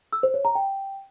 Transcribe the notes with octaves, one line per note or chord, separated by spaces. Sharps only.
E6
C5
C#5
A#5
G5